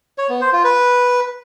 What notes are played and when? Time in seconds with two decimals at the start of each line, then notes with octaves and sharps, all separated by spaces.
0.18 C#5
0.30 B3
0.41 C5
0.53 F4
0.64 B4